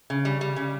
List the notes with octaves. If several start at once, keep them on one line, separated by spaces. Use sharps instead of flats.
C#3
G3
G3
C#3